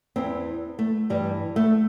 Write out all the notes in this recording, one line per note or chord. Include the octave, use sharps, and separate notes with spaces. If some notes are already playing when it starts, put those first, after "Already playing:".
E2 E3 C4
A3
G2 E3 G3
A3